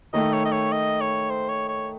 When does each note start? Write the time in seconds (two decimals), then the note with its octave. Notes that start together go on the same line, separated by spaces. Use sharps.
0.13 D#3 A3 D#4 D#5
0.33 C#5
0.45 D#5
0.52 C#5
0.72 D#5
1.01 C#5
1.30 C5
1.49 C#5
1.68 C#5